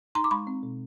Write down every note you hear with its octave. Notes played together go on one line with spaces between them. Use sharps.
D#4 A#5 C6
D6
G#3 B5 C#6
C4
B2